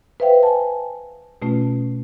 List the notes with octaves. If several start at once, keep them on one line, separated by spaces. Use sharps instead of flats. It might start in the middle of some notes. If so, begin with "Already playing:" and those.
B4 C5 E5 F5 G5
G#5 A5
B2 A3 C#4 F4